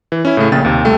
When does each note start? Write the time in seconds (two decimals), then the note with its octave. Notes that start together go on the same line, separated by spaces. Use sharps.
0.12 E3
0.25 C#4 E4
0.37 A2 C#3 A3
0.52 A#1 C#3 A#3 G5 A6
0.65 D#2 C3
0.84 C#2 G3 A3 A4 G5